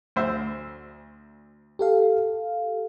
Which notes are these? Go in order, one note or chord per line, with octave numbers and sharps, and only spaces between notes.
D2 C5 E5
G4 A4 F5